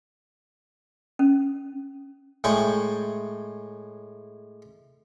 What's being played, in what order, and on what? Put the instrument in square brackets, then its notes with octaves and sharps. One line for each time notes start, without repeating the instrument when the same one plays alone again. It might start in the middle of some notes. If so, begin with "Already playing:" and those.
[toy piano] C#4
[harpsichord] A2 G#3 G5 C#6